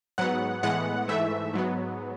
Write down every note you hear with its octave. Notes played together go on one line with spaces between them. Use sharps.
G#2 F#3 B3 F#5
A2 E3 G#3 B3 F#5
G#2 E3 A3 E5
G#2 F#3 B3